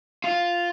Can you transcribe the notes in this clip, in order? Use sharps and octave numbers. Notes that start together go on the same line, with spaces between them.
F4